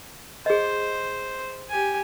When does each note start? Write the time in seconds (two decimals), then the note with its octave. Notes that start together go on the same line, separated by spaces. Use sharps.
0.46 G#4 C5 D#5
1.70 G4 G#5